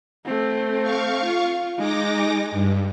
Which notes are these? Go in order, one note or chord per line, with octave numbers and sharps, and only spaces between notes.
A3 C4
F5 C#6
F4
G#3 D#4 D6 A#6
G2